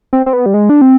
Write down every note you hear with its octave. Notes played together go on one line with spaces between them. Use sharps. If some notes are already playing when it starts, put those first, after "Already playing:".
C4
C4
B3
G3
G#3
D4
C4